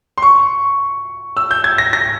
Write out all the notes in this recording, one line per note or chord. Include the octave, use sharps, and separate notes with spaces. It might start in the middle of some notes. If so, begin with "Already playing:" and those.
C6
C#6
E6
G6
G#6
A#6
A#6